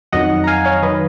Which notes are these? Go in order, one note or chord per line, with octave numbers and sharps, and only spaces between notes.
F2 D#3 F#3 D#5 F#5
A#5
F5 G#5
C#5 F5
D#3 F#3 B4 D#5